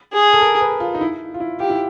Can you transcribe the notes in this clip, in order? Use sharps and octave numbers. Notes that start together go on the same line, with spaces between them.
G#4
A4
A#4
B4
F4
D#4
E4
F4
E4
F4 G4
E4